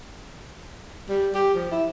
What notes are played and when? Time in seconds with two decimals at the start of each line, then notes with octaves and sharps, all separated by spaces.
1.09 G3
1.34 G4
1.54 F3
1.72 E4